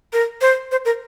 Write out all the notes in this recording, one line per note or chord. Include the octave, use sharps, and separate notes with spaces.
A#4
C5
C5
A#4